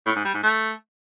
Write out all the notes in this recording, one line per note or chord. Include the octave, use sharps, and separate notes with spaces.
A2
G#2
G3
G#2
A3